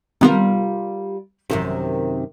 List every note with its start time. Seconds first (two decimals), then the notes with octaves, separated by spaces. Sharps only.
0.21 C3 D#3 G3 B3 F4 A#4
1.50 A1 F#2 C3 D#3